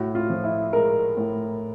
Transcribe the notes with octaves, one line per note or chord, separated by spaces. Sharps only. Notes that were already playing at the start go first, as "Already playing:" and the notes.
Already playing: A2 F#4
F4
F3
E4
G#3 A#4
A2